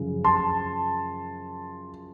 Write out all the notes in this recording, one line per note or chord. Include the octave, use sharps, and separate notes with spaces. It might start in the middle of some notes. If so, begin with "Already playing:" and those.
Already playing: F#2 C#3 F3
A5 C6